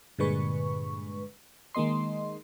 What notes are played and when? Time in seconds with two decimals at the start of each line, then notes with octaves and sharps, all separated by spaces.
0.19 G2 A#2 D3 G#3 B4 C#6
1.75 D#3 G#3 A#3 D#5 C6